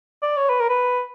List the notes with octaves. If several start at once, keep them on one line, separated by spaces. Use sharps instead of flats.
D5
C#5
B4
A#4
B4